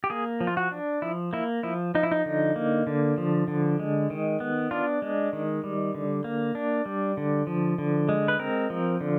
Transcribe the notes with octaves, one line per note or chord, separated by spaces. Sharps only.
G4
A#3 G#4
F3
F4
F#4
D4
F3 E4
A#3 E4
F3 E4
F3 D#4
E4
D#4
D3
A#3
D3
F3
D3
G#3
D#3
B3
D4 F4
G#3
D#3
G3
D3
A#3
D4
G3
D3
F3
D3
G#3
B4
C4 A#4
F3
D3